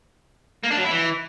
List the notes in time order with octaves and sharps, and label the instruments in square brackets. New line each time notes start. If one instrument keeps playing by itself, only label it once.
[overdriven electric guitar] A#3
D4
F#3
E4
E3